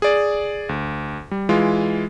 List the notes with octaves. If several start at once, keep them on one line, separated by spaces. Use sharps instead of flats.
G#4 D5
D2
G3
E3 G#3 F4